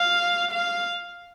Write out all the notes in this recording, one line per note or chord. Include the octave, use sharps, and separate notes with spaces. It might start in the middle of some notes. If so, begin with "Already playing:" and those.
Already playing: F5
F5